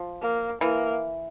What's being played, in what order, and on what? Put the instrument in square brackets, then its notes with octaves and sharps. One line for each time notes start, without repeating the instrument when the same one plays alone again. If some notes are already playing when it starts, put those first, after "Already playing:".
Already playing: [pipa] F3
[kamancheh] A#3
[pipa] E3 [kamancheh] A#3